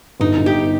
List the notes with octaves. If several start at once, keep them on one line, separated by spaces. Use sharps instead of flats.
G1 D#4
G1
G4